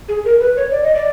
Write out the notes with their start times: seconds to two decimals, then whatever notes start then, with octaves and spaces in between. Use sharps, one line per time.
0.09 G#4
0.25 A#4
0.40 B4
0.57 C#5
0.72 D5
0.83 D#5
0.95 D5